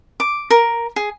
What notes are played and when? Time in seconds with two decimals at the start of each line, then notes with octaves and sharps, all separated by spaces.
0.20 D6
0.50 A#4
0.96 G#4